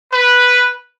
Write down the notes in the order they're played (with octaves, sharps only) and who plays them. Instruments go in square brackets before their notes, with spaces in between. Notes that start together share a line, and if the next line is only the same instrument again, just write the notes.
[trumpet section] B4